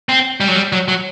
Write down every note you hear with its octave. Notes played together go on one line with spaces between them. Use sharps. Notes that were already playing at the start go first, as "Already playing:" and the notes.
C4
G3
F#3
G3
F#3
F#3